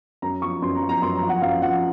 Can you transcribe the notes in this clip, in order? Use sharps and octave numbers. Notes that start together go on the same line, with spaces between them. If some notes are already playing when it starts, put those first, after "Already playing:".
F#2 A#5
F3 C#6
F#2 C6
A#5
F3
A#5
F#2 C6
A#5
F3
F#5
F#2 F5
F3 F#5